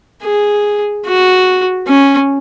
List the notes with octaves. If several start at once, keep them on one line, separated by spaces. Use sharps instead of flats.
G#4
F#4
C#4